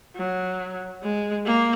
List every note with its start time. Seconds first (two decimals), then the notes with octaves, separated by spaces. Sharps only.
0.16 F#3
1.03 G#3
1.45 A#3